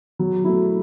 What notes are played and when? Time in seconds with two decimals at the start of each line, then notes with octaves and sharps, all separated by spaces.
0.19 F#3
0.44 A3 E4